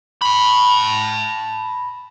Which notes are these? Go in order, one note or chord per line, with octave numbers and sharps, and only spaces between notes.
A5 B5